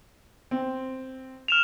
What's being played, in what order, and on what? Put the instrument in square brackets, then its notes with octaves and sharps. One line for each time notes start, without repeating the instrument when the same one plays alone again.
[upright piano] C4
[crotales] F6 E7 F7